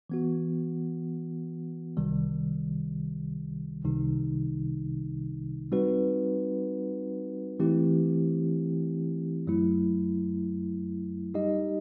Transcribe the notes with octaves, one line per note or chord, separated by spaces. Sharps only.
E3 B3 F#4
C2 C3 D#3 G3
C2 C3 D#3 G3 D#4
G3 C4 D#4 F#4 B4
E3 A3 C4 E4 G4
F#2 F#3 A3 E4
G3 D#4 G4 D#5